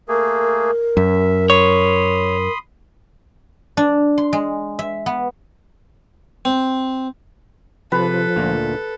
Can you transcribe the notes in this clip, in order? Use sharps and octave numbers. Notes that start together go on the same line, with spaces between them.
A3 A#3 G#4 A#4
F#2 E5
C#5 B5 C6 D#6
D4
C6
G#3
E5
B3
C4
C3 F3 A4 B4
D2 A#2 A#3